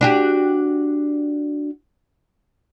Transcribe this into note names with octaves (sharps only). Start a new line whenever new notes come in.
D4 F#4 G4